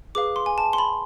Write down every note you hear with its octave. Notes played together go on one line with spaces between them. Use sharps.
G#4 B4 F5 D6
C6
G#5
A5
C6
B5